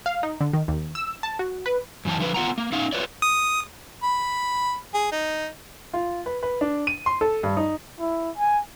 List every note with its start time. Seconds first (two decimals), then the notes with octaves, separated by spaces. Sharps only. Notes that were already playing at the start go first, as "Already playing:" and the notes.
0.06 F5
0.23 D#4
0.41 D3
0.53 D#3
0.68 D#2
0.95 E6
1.23 A5
1.39 F#4
1.66 B4
2.05 F#2 E3 F4 A5
2.20 D3 F3 B4 F5
2.34 B3 F4 F#5 A#5
2.58 A#3
2.72 B3 C#4 D#4 F5
2.93 F4 B4 C#5 D5
3.22 D#6
4.03 B5
4.94 G#4
5.12 D#4
5.93 F4
6.26 B4
6.43 B4
6.61 D4
6.87 D#7
7.06 C6
7.21 A4
7.43 G2
7.57 D#4
8.00 E4
8.38 G#5